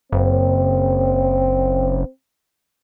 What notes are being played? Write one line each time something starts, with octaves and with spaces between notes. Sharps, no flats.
F#1 C4